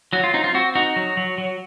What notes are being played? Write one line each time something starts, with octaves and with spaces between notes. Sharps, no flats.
F#3 F#4
F4
C4 D#4
F4
C4 F#4
D#4 F#4
F#3
F#3
F#3